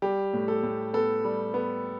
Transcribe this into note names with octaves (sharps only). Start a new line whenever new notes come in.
G3 G4
A2
A4
A2
B3 A4
G3
B3